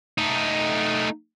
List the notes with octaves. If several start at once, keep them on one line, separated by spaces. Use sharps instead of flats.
A3 D#4